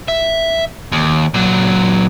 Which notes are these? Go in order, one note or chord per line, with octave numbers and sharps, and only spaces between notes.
E5
D#2
A#2 F#3